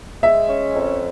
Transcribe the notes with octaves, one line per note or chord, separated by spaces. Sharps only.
G#3 E5
C#4
F2